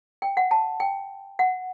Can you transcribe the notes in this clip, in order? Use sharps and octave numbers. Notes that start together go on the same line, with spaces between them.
G5
F#5
A5
G5
F#5